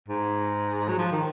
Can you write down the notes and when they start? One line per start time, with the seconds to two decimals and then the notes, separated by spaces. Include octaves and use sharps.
0.08 G#2
0.89 F#3
0.98 F3
1.12 D#3